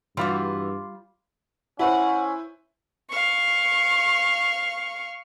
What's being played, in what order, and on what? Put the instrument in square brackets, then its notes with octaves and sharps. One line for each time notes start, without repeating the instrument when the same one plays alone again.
[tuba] G2 [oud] E3 F#4 [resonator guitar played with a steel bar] G3 F4 [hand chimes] C6 D6
[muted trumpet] C#4 [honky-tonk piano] E4 B4 C5 [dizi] F#5
[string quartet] F5 C#6